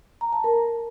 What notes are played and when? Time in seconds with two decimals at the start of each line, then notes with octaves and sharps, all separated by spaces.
0.21 A#5
0.33 A5
0.44 A#4